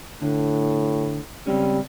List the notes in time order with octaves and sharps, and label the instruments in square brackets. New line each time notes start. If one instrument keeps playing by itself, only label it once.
[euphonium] A2 [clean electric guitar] D3
[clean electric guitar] C#2 C4 C#4 [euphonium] G3